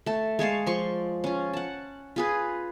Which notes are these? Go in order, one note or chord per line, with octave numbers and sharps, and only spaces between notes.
A3 A5
G#3 C#5 F5 A5
F3 D5 C6 C#6
C#4 F4
F#5 A5
F4 G#4 B4